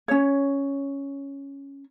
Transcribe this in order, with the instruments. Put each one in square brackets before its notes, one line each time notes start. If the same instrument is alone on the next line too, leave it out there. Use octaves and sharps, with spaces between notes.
[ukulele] C#4 C#5